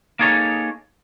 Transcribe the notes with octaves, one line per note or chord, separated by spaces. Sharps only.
A#3 D#4 G#4 A4 C#5